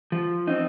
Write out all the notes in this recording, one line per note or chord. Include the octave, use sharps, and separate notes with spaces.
F3
C4 D#4